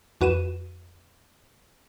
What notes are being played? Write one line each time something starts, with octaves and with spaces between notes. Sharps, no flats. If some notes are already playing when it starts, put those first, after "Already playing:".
F2 F#4 B4 D#7 E7